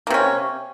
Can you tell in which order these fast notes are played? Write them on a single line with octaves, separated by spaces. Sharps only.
A#3 C3 C#4